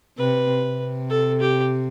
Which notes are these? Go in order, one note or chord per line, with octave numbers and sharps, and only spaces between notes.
C3 B4
C3
A4
G4